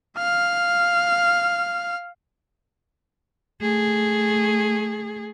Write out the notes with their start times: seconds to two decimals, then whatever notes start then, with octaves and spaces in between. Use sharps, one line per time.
0.18 F5 F6
3.61 A3 G#4